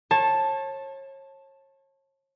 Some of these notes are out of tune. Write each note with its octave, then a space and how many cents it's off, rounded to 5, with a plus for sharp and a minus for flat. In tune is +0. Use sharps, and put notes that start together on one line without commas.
C#5 -35 A5 +0